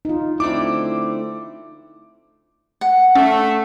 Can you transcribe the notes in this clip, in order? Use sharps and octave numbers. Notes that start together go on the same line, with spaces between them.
D#4 F4
D3 A3 C4 E4 D6
F#5
A3 C#4